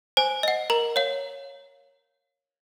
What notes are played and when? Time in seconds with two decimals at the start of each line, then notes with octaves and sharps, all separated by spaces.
0.17 C5 G#5
0.43 D#5 F#5
0.70 A#4 A#5
0.96 C#5 F5